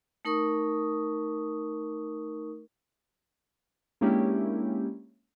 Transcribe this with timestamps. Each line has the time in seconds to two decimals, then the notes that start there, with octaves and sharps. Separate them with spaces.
0.25 A3 D#4 A#4 C#6 D#6
4.01 G#3 A#3 C#4 D4 E4 G4